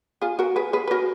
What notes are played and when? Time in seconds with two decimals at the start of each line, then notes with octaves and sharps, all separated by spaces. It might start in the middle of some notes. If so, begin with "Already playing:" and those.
0.22 F4 G#4
0.39 F#4 A#4
0.56 G#4 B4
0.73 G#4 B4
0.88 B4
0.91 F#4 A#4